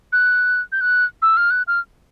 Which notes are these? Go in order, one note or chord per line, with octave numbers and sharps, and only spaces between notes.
F#6
G6
F#6
E6
F6
F#6
F6